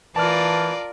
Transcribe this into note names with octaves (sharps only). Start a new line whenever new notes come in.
E3 F4 A#4 D5 A5 F6